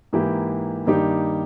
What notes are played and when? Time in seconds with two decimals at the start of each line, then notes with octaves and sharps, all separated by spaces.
0.13 G#2 E3 A#3 E4 G4
0.87 G2 D#3 A#3 D#4 G4